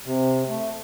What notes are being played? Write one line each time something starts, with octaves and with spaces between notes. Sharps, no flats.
C3
A3